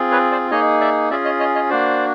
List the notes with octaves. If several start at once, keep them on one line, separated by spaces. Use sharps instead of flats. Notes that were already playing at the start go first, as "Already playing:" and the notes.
Already playing: C4 F4 G#4
B4 C#5
C5 D5
A#3 D#4 G#4 C#5 D#5
D5 E5
C#4 F4 G#4 D5 E5
C#5 D#5
C#5 D#5
C#5 D#5
A#3 D4 F#4 C5 D5